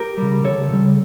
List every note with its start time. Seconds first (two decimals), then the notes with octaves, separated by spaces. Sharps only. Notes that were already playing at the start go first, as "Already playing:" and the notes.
Already playing: G4 A#4
0.17 C#3 G3
0.44 D2 A4 C#5
0.71 C#3 G3